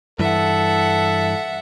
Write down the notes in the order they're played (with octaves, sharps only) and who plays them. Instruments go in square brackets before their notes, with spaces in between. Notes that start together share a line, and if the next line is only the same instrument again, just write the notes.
[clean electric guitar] G2 E3 [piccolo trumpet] A4 [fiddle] E5 F#5